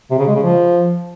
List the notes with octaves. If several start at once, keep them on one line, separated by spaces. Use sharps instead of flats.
C3
C#3
G#3
C#3
F3